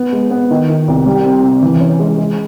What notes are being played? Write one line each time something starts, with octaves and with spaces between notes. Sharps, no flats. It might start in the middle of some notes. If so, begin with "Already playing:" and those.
Already playing: B3
G#3
B3
D#3
D#3
C2
G3
C4
C3
E3
C#4
G#3
G#3